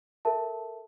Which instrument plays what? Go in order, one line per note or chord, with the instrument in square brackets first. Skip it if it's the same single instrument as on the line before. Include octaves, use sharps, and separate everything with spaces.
[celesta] A4 A#4 E5 A5